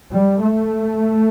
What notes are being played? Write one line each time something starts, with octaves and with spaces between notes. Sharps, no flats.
G3
A3